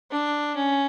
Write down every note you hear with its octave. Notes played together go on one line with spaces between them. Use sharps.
D4
C#4